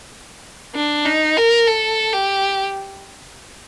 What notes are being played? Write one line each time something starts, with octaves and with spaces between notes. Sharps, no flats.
D4
D#4
A#4
A4
G4